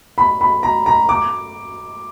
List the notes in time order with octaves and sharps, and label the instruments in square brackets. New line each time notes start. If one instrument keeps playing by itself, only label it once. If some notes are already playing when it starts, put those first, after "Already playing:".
[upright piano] B5
B5
A#5
A#5
D6